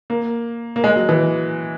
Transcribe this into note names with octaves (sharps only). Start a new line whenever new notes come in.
A#3
A#3
G#3
F#3
E3